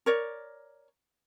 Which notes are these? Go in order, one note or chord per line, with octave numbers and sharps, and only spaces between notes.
A#4 C#5 D5